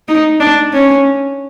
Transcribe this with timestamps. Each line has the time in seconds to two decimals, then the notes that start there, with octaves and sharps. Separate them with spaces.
0.08 D#4
0.40 D4
0.73 C#4